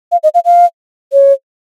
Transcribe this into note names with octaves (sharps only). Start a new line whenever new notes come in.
F5
D#5
F5
F5
C#5